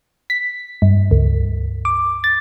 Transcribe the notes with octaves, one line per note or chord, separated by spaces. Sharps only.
B6
G2
C#2
D6
A6